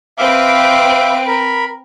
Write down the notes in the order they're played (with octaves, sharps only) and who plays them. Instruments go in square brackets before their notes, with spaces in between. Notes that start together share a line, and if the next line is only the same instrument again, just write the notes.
[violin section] C4 B4 D7 [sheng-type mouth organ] E5 F5 D6
[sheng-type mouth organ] A#4 B5